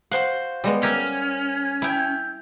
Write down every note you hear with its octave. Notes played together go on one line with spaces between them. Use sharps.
F#4 C5 F5 F#5
G3 G#3 B3
C#4 G4 A#4 E5
E4 E5 G5